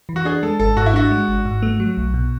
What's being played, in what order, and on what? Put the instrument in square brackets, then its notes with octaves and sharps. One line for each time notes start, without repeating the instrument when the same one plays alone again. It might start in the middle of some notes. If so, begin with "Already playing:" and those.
[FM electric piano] E3
[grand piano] F#4
[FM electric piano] D4 [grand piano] G#4
[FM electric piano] G#3 [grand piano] A4
[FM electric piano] G#1 [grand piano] A4
[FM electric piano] G#2 [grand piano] F#4
[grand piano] E4
[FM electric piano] D4 [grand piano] F#4
[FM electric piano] G#3
G#1
G#2
A3
F#3
B1
B2